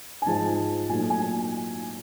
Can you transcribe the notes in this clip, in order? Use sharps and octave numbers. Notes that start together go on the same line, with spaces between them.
G#5
G#2 F3 G#3 A5
A#2 F#3 A3 G#5
G#5